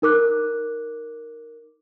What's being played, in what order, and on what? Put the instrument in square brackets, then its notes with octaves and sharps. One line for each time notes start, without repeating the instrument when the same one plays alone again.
[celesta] D#4 A#4 D6 F#6